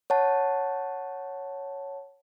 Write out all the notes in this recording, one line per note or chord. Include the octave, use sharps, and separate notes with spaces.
C#5 F#5 A5